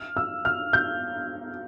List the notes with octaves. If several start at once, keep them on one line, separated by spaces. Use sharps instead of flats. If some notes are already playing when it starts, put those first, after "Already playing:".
Already playing: F6
E6
F6
G6